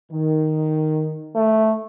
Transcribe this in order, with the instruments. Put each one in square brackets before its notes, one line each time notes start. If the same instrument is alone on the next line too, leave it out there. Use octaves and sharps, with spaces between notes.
[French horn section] D#3
[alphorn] A3